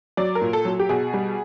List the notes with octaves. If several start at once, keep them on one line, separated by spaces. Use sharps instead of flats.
F#3 D5
A#4
A#2
A4
F#3
G4
B2 G#4
G3